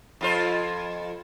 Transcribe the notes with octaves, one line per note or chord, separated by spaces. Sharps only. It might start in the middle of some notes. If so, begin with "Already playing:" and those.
F2 F4 C5